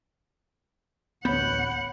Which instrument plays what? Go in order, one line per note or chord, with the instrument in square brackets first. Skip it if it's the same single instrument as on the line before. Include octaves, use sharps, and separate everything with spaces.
[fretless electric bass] A1 B3 [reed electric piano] D2 B5 G6 [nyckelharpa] C#5 [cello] F#5